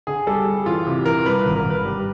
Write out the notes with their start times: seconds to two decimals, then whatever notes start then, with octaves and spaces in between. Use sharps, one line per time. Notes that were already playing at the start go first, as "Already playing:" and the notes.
0.07 D3 G#4
0.27 G3 A4
0.47 G3
0.66 E3 F4
0.87 C3
1.06 E3 A#4
1.26 G2 B4
1.41 B4
1.46 G#1
1.56 A#4
1.66 G#1 B4
1.85 G3